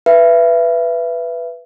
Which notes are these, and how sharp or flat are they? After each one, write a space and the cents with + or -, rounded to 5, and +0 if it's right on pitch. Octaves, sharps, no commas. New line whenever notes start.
B4 +0 E5 +30